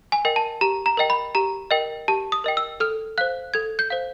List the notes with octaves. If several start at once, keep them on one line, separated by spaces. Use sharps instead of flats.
G#5
A#4 D#5 G5
A5
G4 A#5
A#5
A#4 D#5 G5
B5
G4 A#5
A#4 D#5 G5
G4 A5
D#6
A#4 D#5 G5
E6
A4 F6
C5 F5 F#6
A4 G#6
G6
C5 F5